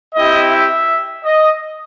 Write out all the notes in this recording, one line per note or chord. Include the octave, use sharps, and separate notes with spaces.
C4 E4 G4 D#5
E5
D#5